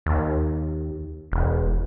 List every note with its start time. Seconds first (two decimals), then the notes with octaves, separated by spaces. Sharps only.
0.06 D#2
1.32 E1